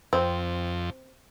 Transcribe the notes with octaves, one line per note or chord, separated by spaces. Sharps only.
F2 C4